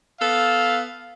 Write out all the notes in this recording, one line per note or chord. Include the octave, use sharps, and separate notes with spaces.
B3 A4 F5